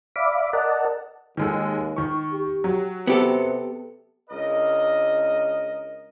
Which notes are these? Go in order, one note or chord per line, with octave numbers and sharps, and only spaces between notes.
D5 E5 F5 B5 D6
A#4 D5 D#5 F#5 A5
D#2 D#3 G#3 A4
D#3 C#6
G4
F#3
C3 B3 G4 A4
C#2 D4 A#4 D#5